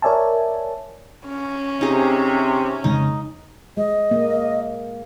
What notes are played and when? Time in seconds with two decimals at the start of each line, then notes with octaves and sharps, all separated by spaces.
0.02 A#4 C#5 D5 E5 G#5 A5
1.28 C#4
1.81 C3 D#4 G#4
2.84 F2 C#3 G#3 D#4
3.77 G#3 D#5
4.11 A#3